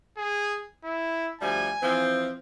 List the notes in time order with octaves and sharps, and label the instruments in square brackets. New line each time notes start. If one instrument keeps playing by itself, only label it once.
[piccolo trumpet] G#4
E4
[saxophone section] D2 F3 G3 [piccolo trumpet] G#5
[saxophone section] E3 F3 C4